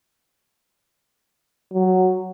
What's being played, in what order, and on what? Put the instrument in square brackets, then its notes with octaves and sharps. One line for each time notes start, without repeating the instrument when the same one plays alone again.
[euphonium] F#3